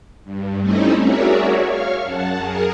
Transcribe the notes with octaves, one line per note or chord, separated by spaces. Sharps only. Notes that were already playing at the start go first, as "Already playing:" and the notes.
G2
G3 A3 C4 C#4 D#4 E4
F#4 G#4 A#4 C#5 D5 E5
C#5 F5 C#6 F6
F#2 F#5 A5
G#4 A#4